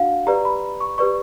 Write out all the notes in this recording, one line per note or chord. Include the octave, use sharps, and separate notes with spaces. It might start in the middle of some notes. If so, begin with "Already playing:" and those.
Already playing: D4 F#4 F5 F#5
G4 B4 D5 A#5
B5
C#6
G4 B4 D5 C#6